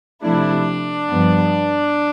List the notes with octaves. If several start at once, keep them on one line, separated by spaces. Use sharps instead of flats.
C3 F3 A3 D4 E4
G2 F3 B3